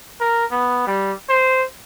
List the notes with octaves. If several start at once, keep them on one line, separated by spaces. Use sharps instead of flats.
A#4
B3
G3
C5